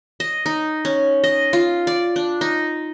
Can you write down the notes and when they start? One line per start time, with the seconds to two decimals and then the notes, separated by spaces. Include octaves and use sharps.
0.20 D#5
0.46 D#4
0.85 C#4
1.24 D#5
1.53 F4
1.87 D5
2.16 D4
2.41 D#4